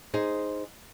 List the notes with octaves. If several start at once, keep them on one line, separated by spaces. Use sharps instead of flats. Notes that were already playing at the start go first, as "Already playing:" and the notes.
D#4 G#4 C5